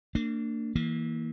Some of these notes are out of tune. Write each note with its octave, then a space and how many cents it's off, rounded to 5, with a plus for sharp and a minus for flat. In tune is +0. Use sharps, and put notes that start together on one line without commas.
A#3 -35 D4 +0
E3 -30 A#3 +0